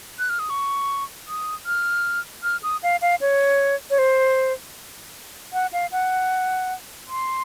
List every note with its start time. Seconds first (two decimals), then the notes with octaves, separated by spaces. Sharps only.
0.19 F#6
0.29 F6
0.39 D#6
0.50 C#6
1.28 D#6
1.66 F6
2.43 F6
2.63 D#6
2.83 F5
3.02 F5
3.21 C#5
3.90 C#5
3.98 C5
5.53 F#5
5.73 F5
5.92 F#5
7.08 C6